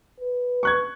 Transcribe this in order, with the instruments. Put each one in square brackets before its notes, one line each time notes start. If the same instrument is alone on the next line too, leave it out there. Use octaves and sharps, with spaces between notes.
[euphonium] B4
[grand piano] C#6 F#6 G#6